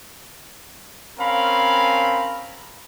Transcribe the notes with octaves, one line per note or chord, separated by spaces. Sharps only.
C4 C#4 A#4 F5 B5